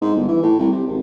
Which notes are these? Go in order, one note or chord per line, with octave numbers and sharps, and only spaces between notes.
G#2
G1
E3
A2
C2
C3
G#1